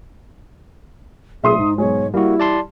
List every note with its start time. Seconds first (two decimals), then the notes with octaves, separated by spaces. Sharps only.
1.44 B1 A#2 A3 G#4 E5 C6 D#6
1.58 G#2 D#4
1.78 B2 F#3 G#3 C#5
2.14 G3 A#3 E4 F#4
2.40 D5 A5 C6